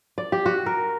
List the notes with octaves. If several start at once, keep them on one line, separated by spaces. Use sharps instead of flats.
D5
G4
F#4
A#4